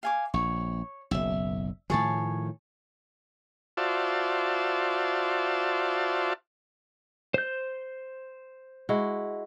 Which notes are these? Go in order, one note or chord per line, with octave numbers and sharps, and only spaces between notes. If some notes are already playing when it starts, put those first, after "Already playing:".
F5 G#5 D6
A#1 C#5
F#1 B1 E5
A2 D#3 F3 G#4 C#5 A5
F4 F#4 C5 D5 E5 A5
C5 G6
G#3 E4 F#4